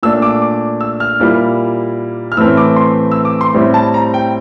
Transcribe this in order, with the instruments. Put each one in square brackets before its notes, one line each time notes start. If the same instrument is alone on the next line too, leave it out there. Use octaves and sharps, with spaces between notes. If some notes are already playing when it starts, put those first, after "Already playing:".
[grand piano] A#2 A3 D4 E6
D6
D6
E6
F6
A#2 G3 A#3 E4
F6
A2 E3 A3 C4 E4 E6
D6
C6
E6
D6
C6
A2 G3 C4 E4
A5
A#5
G5